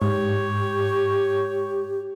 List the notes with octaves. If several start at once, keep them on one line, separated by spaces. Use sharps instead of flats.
G#2 G4 C#5